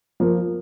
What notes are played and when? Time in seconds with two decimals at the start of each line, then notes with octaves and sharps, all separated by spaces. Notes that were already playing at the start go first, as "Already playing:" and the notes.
0.20 F3 A#3